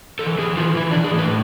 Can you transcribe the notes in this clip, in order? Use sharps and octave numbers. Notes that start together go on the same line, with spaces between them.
E3 A4
E3 G#4
E3 F4
E3 E4
D4
E3
G#4
A2
B4